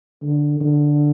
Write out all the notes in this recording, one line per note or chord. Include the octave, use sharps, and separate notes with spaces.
D3
D3